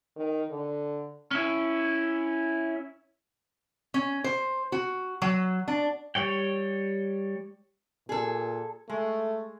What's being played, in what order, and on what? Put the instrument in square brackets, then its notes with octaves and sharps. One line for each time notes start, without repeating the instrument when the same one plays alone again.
[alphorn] D#3
D3
[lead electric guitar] C#4 E4
[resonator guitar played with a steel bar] C#4
C5
F#4
F#3
D4
[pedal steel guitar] G3 C#5 G5
[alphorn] A#2 [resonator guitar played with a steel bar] G#4 A4
[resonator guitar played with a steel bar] G#3 [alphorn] A3